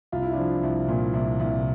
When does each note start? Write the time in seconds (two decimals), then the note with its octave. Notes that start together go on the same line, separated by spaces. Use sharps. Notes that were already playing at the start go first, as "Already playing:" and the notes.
0.12 C2 F4
0.23 E4
0.33 F3 D4 F4
0.63 C2
0.88 A#2
1.14 C2
1.39 C2